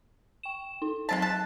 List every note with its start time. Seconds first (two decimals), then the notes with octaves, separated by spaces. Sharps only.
0.43 G5 E7
0.82 D#4
1.09 F#3 G#3 D4 A5 B6
1.22 A5 F#6